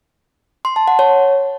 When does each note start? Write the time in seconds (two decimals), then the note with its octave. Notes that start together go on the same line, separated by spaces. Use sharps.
0.65 C6
0.76 A5
0.88 F#5
0.99 C#5